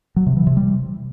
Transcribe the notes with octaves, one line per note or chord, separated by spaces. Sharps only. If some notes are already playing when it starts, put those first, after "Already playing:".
F#3
C3
E3
C3
G3